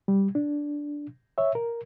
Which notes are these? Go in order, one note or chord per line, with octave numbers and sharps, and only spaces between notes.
G3
D4
C#5 E5
A#4